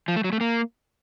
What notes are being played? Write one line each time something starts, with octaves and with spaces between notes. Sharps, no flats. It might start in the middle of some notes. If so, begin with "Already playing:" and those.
F3
A3
F#3
A3
A#3